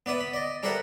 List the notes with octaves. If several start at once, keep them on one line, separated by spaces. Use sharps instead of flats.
B3 D5 E5 D#6
B5
D5 D#5
G3 A4 A#4 C5 E5 F#5